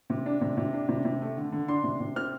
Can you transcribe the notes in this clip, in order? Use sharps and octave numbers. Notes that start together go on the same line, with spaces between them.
C3
D4
C3
C3
D4
C3
C3
A3
D3
D3
D4 C6
C3
C3
C4 F6